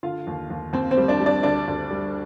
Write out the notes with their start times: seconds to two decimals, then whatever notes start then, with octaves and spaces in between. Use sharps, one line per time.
0.03 D3 F4 F5
0.27 D#2
0.50 D#2
0.73 D#2 C4 C5
0.91 C4 C5
0.98 G3
1.08 D4 D5
1.20 G3
1.26 D4 D5
1.43 D2 D4 D5
1.68 D2
1.91 G3